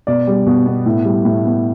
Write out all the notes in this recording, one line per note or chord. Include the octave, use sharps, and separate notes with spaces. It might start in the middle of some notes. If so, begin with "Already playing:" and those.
B2 D5
G3
B2
B3
A2
G3
A2
B3